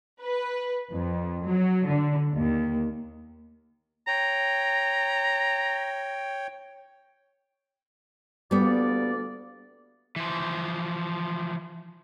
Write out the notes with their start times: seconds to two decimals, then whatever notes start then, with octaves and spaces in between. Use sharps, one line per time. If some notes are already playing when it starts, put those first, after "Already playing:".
0.22 B4
0.93 F2
1.46 F#3
1.88 D3
2.32 D#2
4.08 C#5 G5 A#5
8.51 D2 G3 A#3 B3 D5
10.16 E3 F3